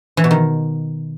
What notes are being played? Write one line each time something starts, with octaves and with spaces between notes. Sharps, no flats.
E3
B2
D#3